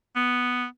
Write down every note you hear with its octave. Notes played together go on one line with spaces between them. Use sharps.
B3